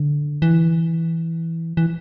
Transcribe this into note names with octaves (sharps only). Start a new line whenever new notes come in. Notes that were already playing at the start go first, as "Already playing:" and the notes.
Already playing: D3
E3
E3